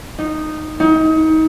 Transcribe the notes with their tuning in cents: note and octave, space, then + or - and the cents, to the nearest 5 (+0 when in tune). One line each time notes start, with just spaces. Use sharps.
D#4 -10
D#4 +30